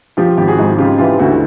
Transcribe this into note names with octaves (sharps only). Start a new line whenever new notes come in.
F3 F4 G4
G#1 G4
F#4 G#4
G#2
C#3 F4 G4
E3 F4 G4
D2 E4 F#4